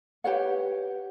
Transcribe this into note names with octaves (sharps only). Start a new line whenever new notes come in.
G4 B4 C#5 F#5